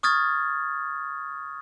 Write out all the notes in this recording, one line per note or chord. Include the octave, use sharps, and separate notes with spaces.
C#6 D#6 F6 G#6 A6